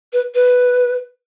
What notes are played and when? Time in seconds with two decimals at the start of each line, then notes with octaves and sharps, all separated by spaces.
0.13 B4
0.35 B4